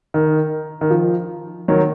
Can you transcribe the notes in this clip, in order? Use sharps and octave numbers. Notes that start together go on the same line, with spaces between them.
D#3
D#3
F3
D#3 F#3